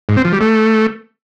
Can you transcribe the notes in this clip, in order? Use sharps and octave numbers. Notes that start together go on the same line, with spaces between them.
G#2
C4
F3
G3
A3